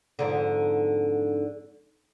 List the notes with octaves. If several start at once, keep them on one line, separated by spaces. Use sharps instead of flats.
F2 G#2 D3